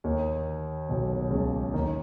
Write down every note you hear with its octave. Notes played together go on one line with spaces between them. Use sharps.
D#2 D#3
B1 B2
C#2 C#3
D#2 D#3